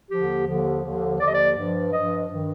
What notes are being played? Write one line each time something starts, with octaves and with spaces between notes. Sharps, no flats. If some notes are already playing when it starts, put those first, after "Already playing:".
D#2 D3 F3 G4
D#2 D3 F3
D#2 D3 F3
D#2 D3 F3 D5
D#5
D5
G2 F3
G2 F3 D#5
G2 D#3